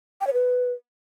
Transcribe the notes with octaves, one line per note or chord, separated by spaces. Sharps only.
G5
C#5
B4